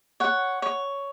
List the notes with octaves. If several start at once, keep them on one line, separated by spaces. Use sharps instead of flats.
C#5 F#5
C#5